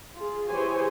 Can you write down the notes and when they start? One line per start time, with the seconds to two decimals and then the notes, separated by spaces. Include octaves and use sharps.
0.15 F4 G#4
0.48 E3 G4 G#4 C5 C#5 G#5